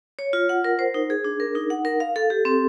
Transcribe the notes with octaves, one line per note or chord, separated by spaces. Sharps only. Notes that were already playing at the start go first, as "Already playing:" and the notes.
C#5
F4
F#5
A#4
C5
D#4
G#4
D4
A#4
D#4
F#5
A#4
F5
A4
G4
C4